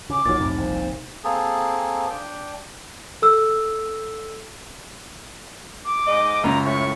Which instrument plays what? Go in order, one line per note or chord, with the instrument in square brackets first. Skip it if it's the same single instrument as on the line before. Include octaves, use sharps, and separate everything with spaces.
[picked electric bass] C#3 [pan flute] D6
[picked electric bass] B1 [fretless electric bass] A#2 F#3 [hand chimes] D#4 A6
[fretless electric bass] C2 [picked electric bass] F2 A2 C3
[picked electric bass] G1 F2 A#2 [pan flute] C5
[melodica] A#3 C4 G#4 A4
D4 G5
[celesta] A4 E6
[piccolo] D6
[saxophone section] G#2 D#5
[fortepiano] C#2 F#2 [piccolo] A#5
[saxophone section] A2 [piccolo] C#6